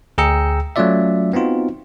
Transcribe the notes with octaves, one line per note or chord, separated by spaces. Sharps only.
D2 G#4 G5 A#5 E6 C#7
F#3 A3 C#4 F4 D5 E5
B3 C4 D#4 F4 F#4